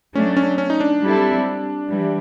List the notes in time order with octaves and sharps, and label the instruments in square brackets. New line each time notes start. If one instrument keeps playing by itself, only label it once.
[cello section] F#3 A3 D4 [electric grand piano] C#4
[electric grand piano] C#4
C#4
D#4
D4
[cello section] G3 C4 E4 A4
E3 G3